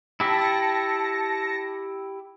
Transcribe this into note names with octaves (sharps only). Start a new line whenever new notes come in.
E4 G4 E5 A5 A#6 C#7